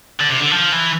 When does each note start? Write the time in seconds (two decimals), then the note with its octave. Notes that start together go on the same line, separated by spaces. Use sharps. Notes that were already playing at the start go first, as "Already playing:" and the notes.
0.20 D3
0.29 C3
0.40 D3
0.51 F3
0.72 E3